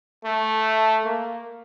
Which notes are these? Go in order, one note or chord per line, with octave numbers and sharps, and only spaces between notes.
A3
A#3